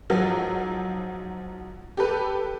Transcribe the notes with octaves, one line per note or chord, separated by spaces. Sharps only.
G#2 F3 F#3
G4 A4 B4